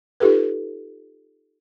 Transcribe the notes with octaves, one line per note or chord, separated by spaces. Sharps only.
D#4 F4 G4 A4 B4